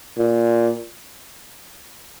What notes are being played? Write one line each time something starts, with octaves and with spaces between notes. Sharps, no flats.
A#2